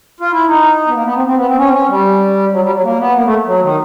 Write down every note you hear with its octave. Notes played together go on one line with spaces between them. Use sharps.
F4
E4
D#4
B3
A#3
B3
C4
C4
B3
C4
C#4
C4
C#4
G3
F#3
G3
F#3
A#3
B3
A#3
A3
F#3
D#3